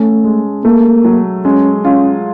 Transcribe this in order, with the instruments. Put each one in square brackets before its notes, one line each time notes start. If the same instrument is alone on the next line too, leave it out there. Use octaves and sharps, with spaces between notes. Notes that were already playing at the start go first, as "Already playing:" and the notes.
Already playing: [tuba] A3 [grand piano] C#4 A4
[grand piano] G#3
[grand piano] A3 [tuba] A#3
[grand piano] F#3
[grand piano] G#3 [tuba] C#4
[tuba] C#4 [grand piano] F4